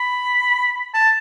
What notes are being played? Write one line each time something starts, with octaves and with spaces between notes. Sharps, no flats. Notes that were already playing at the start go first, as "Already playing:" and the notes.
Already playing: B5
A5